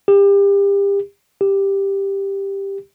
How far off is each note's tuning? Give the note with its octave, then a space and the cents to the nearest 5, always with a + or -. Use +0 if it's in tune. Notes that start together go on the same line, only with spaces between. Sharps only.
G4 +30
G4 +5